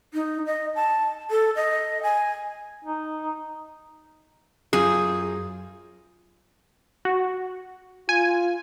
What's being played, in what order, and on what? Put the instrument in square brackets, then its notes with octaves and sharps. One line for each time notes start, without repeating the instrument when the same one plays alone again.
[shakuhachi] D#4
D#5
A5
A4
D#5
G#5
[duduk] D#4
[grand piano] F#2 F4 [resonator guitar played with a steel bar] G#4
[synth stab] F#4
[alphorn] F4 [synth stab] G#5